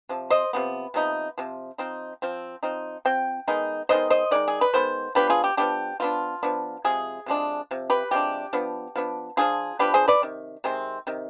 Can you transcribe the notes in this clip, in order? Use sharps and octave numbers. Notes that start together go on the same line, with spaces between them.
C3 F3
C5 D#5
C3 F3 B3
C3 F3 B3 D#4
C3 F3
F3 C4 D#4
F3 C4
F3 C4 D#4
F3 C4 G5
D#3 G#3 B3 D#4
D#3 G#3 B3 D#4 C5 D#5
C5 D#5
D#3 G#3 D#4 D5
G#4
B4
D#3 G#3 B3 C5
F3 B3 D4 G4 B4
F4 G#4
G4
F3 B3 D4 G4
F3 B3 D4 F4
F3 B3 D4
C3 F3 G#3 G#4
C3 F3 G#3 D4
C3 F3
G4 B4
C3 F3 G#3 D4 G4
F3 B3 D4
F3 B3 D4
F3 B3 D4 F4 G#4
F3 B3 D4 G4 B4
G#4 C5
B4 D5
C3 D#3
C3 D#3 G#3 C4
C3 D#3